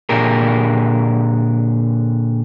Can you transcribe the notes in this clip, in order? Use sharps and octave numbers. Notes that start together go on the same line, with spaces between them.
A#2 D3 G4 G#4 A#4